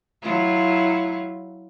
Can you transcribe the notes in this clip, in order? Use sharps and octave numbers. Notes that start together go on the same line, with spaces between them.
F#3 E4 F4